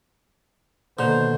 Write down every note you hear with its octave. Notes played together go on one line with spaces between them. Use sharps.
B2 D3 D#3 A#3 C5